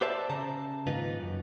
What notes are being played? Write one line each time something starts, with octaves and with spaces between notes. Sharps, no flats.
G4 B4 C5 D5 E5 A5
C#3 A5 A#5
D#2 G#2 D#4 F4 B4
F#2